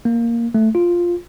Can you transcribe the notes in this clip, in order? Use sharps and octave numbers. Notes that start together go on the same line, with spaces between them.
A#3
A3
F4